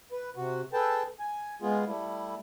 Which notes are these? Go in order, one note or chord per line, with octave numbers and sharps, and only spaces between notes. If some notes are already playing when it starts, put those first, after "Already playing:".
B4
C3 F#4
G#4 A4 B4 G5 A5
G#5
G#3 B3 F4 G#4
G3 A3 E4